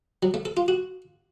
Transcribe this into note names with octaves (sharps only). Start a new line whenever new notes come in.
F#3
A3
A4
F4
F#4